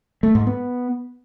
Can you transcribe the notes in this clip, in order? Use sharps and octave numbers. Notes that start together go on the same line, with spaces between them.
A3
G#2
B3